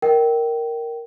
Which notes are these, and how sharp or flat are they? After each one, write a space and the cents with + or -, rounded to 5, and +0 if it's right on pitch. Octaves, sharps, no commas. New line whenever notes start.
A#4 +0 D#5 +0 G5 -20